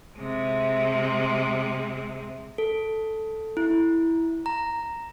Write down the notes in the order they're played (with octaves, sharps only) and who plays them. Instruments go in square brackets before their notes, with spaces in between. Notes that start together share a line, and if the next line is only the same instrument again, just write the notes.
[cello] C3 G#3
[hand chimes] A4
E4
A#5